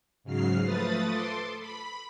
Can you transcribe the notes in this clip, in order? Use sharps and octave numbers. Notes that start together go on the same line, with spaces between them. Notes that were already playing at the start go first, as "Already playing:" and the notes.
G#2 C#3 F#3 F6 C7
F3 A3 B4 D#6 A6
A4 C6 D6
B5